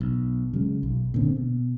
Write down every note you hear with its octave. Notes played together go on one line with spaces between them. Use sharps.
B1
C#3 F#3 G#3
B1
A#2 D3 C4
B2